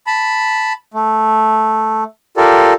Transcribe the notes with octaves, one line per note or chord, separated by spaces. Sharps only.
A5 B5
A3
F4 G4 A4 A#4 D5